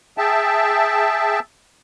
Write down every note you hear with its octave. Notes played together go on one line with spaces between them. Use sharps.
G#4 E5 G5 A5